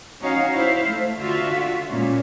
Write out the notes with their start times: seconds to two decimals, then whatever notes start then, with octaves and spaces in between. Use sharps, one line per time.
0.21 C#4 D#4 F#4 C#5 F5
0.54 E4 C5 E5 F5
0.89 A3
1.19 D3 F4 F#4 E5 F5
1.89 A#2 G#3 C#4